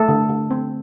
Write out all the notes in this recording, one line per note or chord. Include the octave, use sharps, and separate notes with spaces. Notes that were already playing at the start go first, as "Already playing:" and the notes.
Already playing: A3 A4
D3
D3
C4